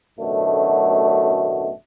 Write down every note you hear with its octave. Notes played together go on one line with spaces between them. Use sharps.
A1 F#2 B2 D3 A3